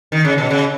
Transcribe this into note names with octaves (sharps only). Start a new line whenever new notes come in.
D#3
C#3
B2
C#3